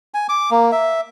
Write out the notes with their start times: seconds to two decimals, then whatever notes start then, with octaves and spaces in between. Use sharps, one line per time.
0.14 G#5
0.29 D6
0.51 A#3
0.72 E5